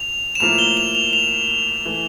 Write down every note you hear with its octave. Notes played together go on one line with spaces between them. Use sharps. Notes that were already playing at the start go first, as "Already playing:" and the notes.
Already playing: F7
E7
A2 F3 A#3 E4 F7
G7
F7
F7
F7
E3 A3